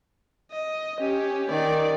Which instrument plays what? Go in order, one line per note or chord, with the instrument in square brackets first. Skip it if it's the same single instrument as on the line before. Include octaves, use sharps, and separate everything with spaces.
[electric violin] D#5
C#4 G4
[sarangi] D#3 [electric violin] D5